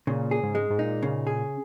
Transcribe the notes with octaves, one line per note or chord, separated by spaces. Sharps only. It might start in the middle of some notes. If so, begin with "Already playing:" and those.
A#2 C#3
G#4
G#2
G#3
G#2
A#2 D#4
C#3
G#4